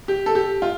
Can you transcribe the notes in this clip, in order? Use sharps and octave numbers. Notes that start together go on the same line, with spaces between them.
G4
A4
G4
F4